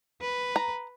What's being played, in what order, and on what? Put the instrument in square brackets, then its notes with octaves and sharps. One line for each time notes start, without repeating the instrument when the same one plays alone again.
[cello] B4
[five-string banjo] A#5